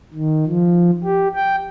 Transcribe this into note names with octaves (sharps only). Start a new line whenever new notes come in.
D#3
F3
G4
G5